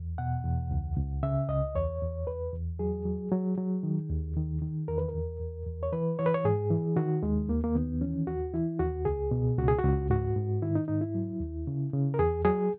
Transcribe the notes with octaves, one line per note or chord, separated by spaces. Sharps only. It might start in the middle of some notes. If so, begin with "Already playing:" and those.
Already playing: E2
B2 F#5
E2
C#2
C#2
C#3 E5
C#2 D#5
E2 C#5
E2
E2 B4
E2
F#3 G#4
F#3
F#3
F#3
D#3
D#2
D#3
D#3
E2 A#4
B4
A#4
E2
E2
E2
C#5
E3 B4
E3 C#5
B4
C#5
G#2 G#4
E3
D#3 F#4
D#2 G#3
D#2 A#3
A#3
D#3 B3
E3 C#4
D#2 F#4
E3 E4
D#2 F#4
C#2 G#4
B2
C#2 F#4
G#4
F#4
C#2
G#2 F#4
G#2
D#3 E4
D#4
G#2 D#4
E4
F#3
D#2
C#3
C#3
A#4
E2 G#4
F#3 G#4